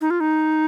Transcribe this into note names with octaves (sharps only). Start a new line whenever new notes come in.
D#4
F4
D#4